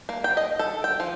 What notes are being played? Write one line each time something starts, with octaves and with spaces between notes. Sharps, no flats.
A#3
G5
D#5
A4
G5
F3